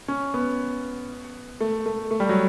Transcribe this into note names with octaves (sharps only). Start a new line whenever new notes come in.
C#4
B3
A3
A3
A3
G3
F#3